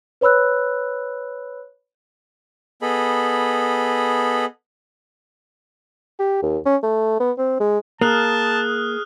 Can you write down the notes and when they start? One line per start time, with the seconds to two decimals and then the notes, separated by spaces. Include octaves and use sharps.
0.21 B4 C#5 B5 E6 F#6
2.82 B3 G#4 A4 D#5 B5
6.19 G4
6.42 D#2
6.66 C#4
6.83 A3
7.20 B3
7.38 C4
7.60 G#3
8.01 A#3 G#4 A5 D#6 F6 F#6